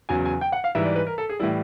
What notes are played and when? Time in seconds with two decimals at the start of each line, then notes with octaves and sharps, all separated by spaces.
0.09 E2 C#3 F#3 G#5
0.25 G#5
0.41 G5
0.52 F#5
0.64 F5
0.75 G#2 E3 G3 E5
0.85 D5
0.96 B4
1.07 A#4
1.18 A4
1.29 G#4
1.39 A2 E3 G3 E4